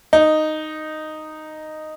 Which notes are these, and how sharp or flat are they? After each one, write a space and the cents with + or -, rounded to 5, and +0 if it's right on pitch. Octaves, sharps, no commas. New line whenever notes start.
D#4 -5